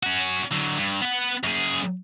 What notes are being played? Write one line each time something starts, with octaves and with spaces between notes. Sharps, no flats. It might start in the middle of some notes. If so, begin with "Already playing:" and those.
C#4 F#4
D3 F#3
G2
B3 F#5
F#2 G#4